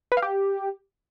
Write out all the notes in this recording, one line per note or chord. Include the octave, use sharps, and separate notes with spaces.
B4
F5
G4